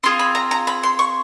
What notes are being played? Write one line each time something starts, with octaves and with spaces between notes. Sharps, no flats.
C4 F4 G#4 C6
B5
A#5
A#5
B5
C6
C#6